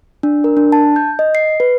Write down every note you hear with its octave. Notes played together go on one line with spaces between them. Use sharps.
D4
A#4
D4
A5
G6
D#5
C7
B4